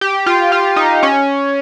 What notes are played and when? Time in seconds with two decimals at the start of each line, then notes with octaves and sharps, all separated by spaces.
0.01 G4
0.26 F4
0.52 F4
0.76 D#4
1.03 C#4